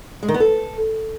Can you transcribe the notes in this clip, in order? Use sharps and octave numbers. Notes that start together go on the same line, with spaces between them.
G#3
D#3
B3
A4